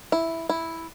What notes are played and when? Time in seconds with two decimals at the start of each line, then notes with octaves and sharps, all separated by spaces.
0.12 E4
0.49 E4